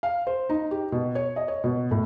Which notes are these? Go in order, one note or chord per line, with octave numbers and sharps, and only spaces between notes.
F5
C5
D#4
G4
B2
C#5
D#5
C#5
B2
A2